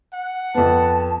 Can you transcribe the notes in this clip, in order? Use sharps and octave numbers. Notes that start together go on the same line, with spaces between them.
F#5
F2 B3 A5